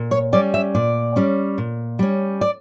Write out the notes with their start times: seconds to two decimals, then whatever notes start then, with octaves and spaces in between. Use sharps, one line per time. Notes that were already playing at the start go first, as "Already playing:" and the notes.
Already playing: A#2
0.11 C#5
0.33 G3 C#4 D5
0.54 E5
0.75 A#2 D5
1.16 G3 C#4
1.58 A#2
1.99 G3 C#4
2.41 D5